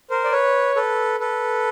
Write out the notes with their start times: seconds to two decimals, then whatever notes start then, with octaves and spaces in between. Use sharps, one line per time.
0.10 A#4 C5
0.24 D5
0.32 B4 C#5
0.76 A4 B4
1.20 A4 B4